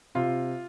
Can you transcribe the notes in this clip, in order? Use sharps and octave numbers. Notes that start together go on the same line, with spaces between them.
C3 F4